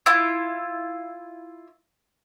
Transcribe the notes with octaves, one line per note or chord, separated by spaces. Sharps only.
E4 F4